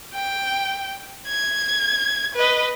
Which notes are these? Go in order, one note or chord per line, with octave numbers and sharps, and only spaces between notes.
G5
G#6
B4 D#5